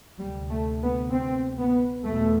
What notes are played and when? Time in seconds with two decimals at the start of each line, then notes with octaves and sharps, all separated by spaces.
0.18 D2 C3 G3
0.49 A3
0.81 B3
1.11 C4
1.58 B3
2.04 E2 B2 A3